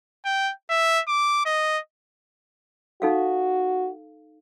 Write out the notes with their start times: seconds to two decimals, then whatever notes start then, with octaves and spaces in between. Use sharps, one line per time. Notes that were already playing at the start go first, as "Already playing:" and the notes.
0.25 G5
0.70 E5
1.08 D6
1.46 D#5
3.02 D#4 F#4 A4 F5